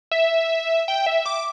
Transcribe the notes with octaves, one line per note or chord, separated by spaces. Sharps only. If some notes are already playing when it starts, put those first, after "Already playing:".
E5
G5
E5
D6